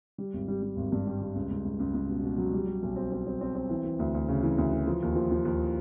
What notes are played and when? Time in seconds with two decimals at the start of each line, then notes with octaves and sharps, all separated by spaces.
0.18 G3
0.34 G#1
0.48 G3
0.63 G3
0.77 G#1
0.92 G2
1.07 G3
1.21 G3
1.35 C#2
1.51 C#2
1.65 C#2
1.79 C#2
1.94 C#2
2.09 B2
2.23 B2
2.38 F#3
2.53 G3
2.67 G3
2.82 B1
2.96 C4
3.12 C4
3.27 C4
3.41 C4
3.55 C4
3.69 E3
3.85 E3
3.99 D2
4.14 D2
4.28 C#3
4.43 E3
4.58 D2
4.72 E3
4.87 F3
5.02 D#2
5.15 F3
5.31 F3
5.45 D#2